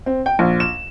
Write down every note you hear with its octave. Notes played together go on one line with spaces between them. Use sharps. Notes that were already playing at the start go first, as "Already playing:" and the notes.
C4
G5
A#1
E7